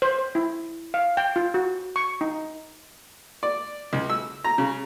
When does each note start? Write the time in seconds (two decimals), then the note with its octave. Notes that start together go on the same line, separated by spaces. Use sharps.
0.02 C5
0.18 C5
0.35 E4
0.94 F5
1.17 G5
1.36 F4
1.54 F#4
1.96 C#6
2.21 D#4
3.43 D5
3.93 C#2
4.10 E6
4.44 A#5
4.58 C#3